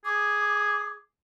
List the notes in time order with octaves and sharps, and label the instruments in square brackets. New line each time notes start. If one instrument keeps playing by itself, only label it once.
[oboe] G#4 [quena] D6